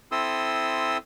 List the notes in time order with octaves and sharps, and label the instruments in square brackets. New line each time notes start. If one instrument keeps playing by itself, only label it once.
[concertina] C4 E4 A4 C6 D#6 E6